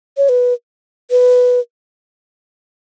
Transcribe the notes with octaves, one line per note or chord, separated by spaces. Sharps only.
C#5
B4
B4